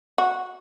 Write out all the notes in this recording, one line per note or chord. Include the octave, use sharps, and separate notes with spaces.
F#4